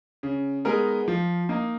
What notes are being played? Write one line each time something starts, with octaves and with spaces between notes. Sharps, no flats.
C#3
G#3 B3 D#4 A#4
F3
A#3 D#4